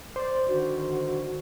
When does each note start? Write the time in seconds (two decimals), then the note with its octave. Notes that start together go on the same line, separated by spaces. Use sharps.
0.16 C5 D5
0.48 D3 D#3 F#4